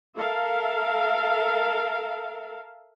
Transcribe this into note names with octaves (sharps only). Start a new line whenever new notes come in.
A4 A#4 E5 F5